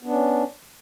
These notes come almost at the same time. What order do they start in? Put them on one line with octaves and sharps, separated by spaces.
B3 D4 C#4